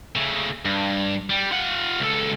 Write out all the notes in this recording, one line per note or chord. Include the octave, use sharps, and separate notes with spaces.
C#3 A3
G2
G3
F4 F#5
C#2 A4